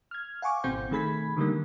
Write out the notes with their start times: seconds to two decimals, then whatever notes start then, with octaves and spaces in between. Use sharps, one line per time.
0.11 F6 G#6
0.42 F5 F#5 G#5 C#6 D6
0.64 G#1 B2 C4 C5 G6
0.91 D#3 A3 G#4 B5 G#6 B6
1.37 D3 D#3 G3 A#3